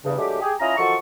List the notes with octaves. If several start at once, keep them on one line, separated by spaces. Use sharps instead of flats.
E2 G2 C#3
D3 F#3 G#3 A3 G4
G4 G#4
C#4 E4 F4 D#5 A#5
D#3 F3 F#3 F#4 A4 C#6